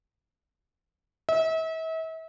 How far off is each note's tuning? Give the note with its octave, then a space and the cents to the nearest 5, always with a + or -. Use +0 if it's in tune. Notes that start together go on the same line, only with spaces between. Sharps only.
E5 -40